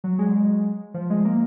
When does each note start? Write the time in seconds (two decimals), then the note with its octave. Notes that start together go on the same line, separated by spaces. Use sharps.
0.04 F#3
0.19 G#3
0.94 F3
1.10 G#3
1.25 A#3